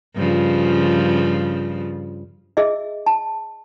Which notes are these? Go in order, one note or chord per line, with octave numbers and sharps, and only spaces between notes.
G2 C#3 F3
G#4 D#5 E5
A5